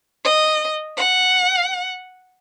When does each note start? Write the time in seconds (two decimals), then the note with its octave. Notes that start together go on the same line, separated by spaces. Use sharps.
0.24 D#5
0.97 F#5